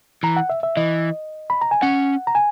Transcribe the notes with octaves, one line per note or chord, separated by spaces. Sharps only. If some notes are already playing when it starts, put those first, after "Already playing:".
E3 A#5
F#5
E5
E5
E3 D#5
B5
A#5
G#5
C#4 F#5
A#5
G#5